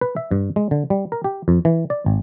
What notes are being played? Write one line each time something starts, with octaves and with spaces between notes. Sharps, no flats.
B4
E5
G2
G#3
D3
G3
A#4
G4
F2
E3
D5
G#1